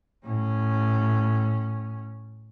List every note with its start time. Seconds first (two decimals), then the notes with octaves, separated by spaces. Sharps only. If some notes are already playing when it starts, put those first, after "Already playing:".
0.24 A2 C#4